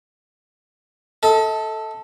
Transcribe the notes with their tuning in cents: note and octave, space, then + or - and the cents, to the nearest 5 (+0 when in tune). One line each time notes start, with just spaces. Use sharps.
A4 +0 D#5 +45